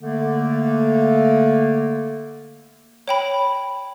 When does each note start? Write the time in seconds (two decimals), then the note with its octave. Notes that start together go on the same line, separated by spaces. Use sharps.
0.01 D3 A3 A#3
3.08 C#5 G5 B5